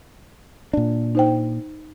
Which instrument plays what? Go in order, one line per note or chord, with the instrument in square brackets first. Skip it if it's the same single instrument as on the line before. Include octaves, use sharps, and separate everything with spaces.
[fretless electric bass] A#2 D4
[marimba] D#4 C5 G5